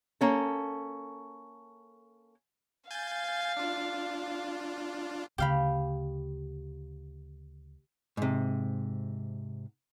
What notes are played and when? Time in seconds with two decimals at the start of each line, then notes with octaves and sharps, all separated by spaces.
0.21 A#3 C#4 A4
2.91 F5 G#5 G6 A6
3.57 D4 F4
5.38 D2 C#3 G4 F5 B5
8.17 G#2 C3